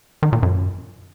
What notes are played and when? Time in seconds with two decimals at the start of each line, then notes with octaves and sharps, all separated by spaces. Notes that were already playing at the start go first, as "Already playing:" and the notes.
0.23 D#3
0.33 A#2
0.43 F#2